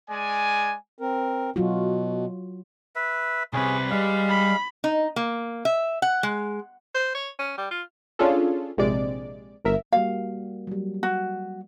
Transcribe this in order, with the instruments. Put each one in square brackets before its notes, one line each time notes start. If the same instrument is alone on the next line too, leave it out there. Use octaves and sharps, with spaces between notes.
[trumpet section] G#3 D5 G#5
[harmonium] C4 A#4
[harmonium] B2 [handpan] F#3 F4 F#4
[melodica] B4 E5
[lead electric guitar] C2 C3 [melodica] C#4 G#4 [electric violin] B4
[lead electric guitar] G3 [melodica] G#3 F5
[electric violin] B5
[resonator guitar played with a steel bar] D#4
A#3
E5
F#5
G#3
[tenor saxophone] C5
C#5
C#4
G3
F4
[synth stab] C#4 D4 F4 G#4 A4
A#1 C3 G#3 D5 D7
G1 A#4 E5
[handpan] G3 A#3 F#4 [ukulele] F5
[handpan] F#3 G3
[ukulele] F#4